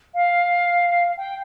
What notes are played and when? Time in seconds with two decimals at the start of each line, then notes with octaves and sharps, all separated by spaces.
0.14 F5
1.17 G5